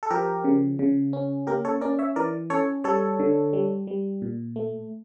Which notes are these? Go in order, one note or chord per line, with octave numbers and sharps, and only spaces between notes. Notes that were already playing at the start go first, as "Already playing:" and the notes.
A4
F3 G4 A#4
C#3
C#3
C#4
A#3 G4 A#4
A4 C#5
C#4 A#4 D5
C#5 E5
E3 A#4 D5
C#4 A4 C#5
G3 A4 C#5
D3
G3
G3
A#2
A3